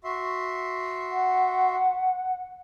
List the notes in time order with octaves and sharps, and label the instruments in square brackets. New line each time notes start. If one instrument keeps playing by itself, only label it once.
[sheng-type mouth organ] F#4 E5 C6
[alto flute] F#5